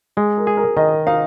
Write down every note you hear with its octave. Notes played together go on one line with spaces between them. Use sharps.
G#3 G#4
A#4
G#4
A#4
D#3 D#5
D#4 F5